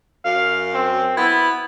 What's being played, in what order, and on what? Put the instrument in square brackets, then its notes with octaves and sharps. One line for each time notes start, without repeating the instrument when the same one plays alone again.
[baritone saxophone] F#2 [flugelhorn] F5
[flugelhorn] C4
[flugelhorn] B3 [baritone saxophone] E4